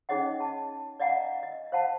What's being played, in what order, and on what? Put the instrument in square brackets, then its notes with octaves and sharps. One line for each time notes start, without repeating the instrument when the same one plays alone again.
[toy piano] C#4 D#4 G#4 C#5 D#5 F#5
A5
D5 D#5 F5 F#5 G#5 A#5
D#5
C5 F5 F#5 A5